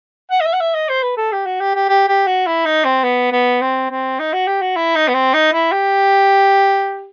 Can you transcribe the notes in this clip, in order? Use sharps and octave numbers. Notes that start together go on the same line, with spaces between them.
F#5
D#5
E5
F#5
E5
D#5
C5
B4
A4
G4
F#4
G4
G4
G4
G4
F#4
E4
D#4
C4
B3
B3
C4
C4
D#4
F#4
G4
F#4
E4
D#4
B3
C4
D#4
E4
G4